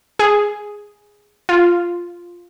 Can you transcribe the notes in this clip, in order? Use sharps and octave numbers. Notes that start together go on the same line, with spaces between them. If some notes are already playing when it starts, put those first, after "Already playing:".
G#4
F4